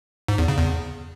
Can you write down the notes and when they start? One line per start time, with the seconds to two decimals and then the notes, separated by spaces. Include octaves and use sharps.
0.28 G#2
0.38 E2
0.48 C#3
0.58 E2